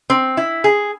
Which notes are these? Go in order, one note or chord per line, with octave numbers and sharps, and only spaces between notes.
C4
E4
G#4